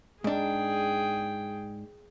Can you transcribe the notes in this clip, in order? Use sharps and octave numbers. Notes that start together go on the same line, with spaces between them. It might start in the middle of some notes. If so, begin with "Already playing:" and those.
G#2 D4 G#4 G5